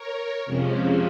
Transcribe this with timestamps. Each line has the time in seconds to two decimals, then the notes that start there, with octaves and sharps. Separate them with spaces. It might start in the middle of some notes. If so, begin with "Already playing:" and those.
Already playing: A#4 C#5
0.46 F2 C3 F3 G#3 C#4